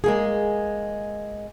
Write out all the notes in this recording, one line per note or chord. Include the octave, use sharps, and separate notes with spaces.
G#3 A#3 G#4